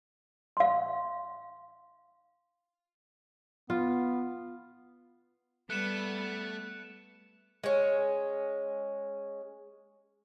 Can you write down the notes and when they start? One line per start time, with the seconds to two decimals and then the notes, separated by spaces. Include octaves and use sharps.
0.57 F5 C6
3.70 B3 F4
5.70 G3 A3 B3 F#6 C#7 E7
7.64 G#3 C#4